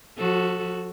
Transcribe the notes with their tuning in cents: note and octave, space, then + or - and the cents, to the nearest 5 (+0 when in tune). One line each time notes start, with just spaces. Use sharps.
F3 +40 F#4 +0 A4 +0